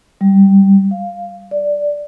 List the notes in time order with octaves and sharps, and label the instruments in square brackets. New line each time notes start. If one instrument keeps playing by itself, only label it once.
[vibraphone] G3
F5
D5